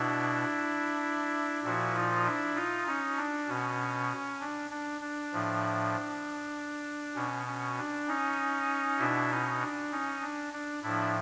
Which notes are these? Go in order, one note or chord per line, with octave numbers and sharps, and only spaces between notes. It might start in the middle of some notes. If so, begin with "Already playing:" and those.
Already playing: B2 D4 E4
A#2 F3 E4 F#4
D#4 F4
D4 E4
D#4 F4
C#4 D#4
D4
B2 C#4
D4
D4
D4
A2 F3
B2 C#4
C#4
D4
C#4 D#4
B2 D4 E4
C#4 D#4
D4
C#4 D#4
D4
D4
A2 F3 D4 E4